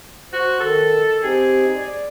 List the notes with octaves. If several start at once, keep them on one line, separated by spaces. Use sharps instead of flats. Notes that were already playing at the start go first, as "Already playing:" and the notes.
F#4 C5
D#3 A4
C4 D#4 G4 G#4
D5